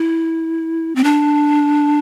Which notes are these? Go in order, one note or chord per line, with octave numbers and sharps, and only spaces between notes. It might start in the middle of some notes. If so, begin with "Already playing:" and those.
Already playing: E4
C4
D4